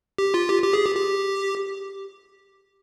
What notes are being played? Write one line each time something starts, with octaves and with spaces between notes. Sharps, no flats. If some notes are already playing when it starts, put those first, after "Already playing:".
G4
F4
G4
G4
G#4
G4
G4